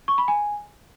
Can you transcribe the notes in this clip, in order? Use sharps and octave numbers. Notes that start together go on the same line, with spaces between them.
C#6
B5
G#5